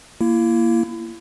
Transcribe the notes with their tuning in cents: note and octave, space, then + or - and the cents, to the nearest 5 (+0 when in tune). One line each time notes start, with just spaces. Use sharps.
A#3 +0 E4 +30